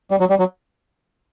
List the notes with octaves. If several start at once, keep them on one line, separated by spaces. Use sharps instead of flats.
G3
F#3
G3
F#3